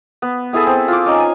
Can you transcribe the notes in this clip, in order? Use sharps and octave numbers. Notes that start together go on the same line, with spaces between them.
B3
B3 E4 G#4 A4
C4
F4 D6
C#4 D#4 A#5
G#5